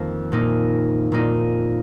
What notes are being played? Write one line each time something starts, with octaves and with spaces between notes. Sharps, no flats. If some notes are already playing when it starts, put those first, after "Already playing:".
Already playing: F2 D#3 A#3
A#2 A#3 D#4
A#2 A#3 D#4